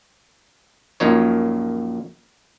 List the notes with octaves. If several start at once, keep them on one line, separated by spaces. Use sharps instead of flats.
A#1 F#2 A#2 D#4 C#5